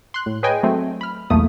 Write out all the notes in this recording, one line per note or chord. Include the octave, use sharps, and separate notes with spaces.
C6 F#6
A2
G#4 B4 C#5 D#5 G5 G#5
F#3 A3 C4
B5 F6
B1 E2 A3 A#3 D#6